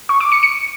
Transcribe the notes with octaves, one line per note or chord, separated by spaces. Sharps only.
C#6
D6
C#7
C#7